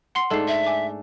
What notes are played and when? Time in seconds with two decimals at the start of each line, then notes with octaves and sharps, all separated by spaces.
0.15 F#5 C6 C7
0.30 G#2 A3 D4 A4 C7
0.48 E5
0.66 G#5 D6